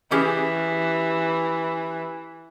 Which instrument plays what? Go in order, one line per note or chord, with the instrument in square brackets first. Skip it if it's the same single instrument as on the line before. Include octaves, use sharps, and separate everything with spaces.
[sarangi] E3 [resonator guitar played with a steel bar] C#4 G4 G#4